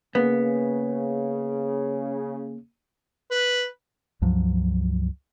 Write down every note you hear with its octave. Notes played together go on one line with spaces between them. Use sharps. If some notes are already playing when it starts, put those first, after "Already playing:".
C#3 A#3 B3
B4
C#2 G2 F3 F#3